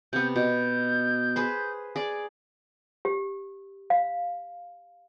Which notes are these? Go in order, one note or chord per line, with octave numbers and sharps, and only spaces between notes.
C3 B3 G6
B2 G6
G#4 B4 C5
G#4 D5
G4
F5